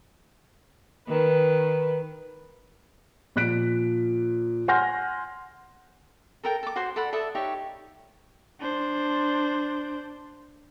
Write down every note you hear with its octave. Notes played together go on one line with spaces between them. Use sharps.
D#3 B4
A#2 F3 F#6 B6 D7
F#5 G#5 C6 F6 G6 A#6
A4 A#4 G5
A4 D6
F#4 C5 C6
A4 D5 F#5 B5
A4 D5 E5 D#6
D#4 G4 C#5 E5
D4 C5